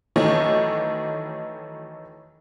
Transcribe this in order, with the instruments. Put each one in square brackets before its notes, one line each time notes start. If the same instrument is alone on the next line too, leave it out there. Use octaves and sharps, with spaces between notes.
[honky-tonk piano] D#3 E3 F#3 A3 C#4 D#4